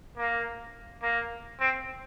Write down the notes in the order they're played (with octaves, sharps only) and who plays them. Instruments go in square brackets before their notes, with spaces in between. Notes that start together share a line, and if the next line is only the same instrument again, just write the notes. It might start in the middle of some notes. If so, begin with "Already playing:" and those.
[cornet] A#3
A#3
C4